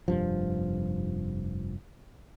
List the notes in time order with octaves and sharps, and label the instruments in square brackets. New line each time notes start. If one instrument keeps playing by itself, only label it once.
[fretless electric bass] F1 G2 F3